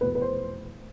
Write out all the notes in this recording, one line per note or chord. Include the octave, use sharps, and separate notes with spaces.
F1 E2 B2 B4
B4
C5